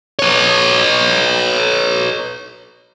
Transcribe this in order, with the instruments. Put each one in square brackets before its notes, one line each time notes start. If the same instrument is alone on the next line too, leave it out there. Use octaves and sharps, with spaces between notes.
[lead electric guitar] B4 C#5